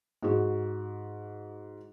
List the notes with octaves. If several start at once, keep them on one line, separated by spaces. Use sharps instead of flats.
G#2 F#4